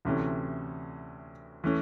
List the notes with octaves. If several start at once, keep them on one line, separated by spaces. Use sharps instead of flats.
D2 C3 E3 A3 C#4
E3 A3 C#4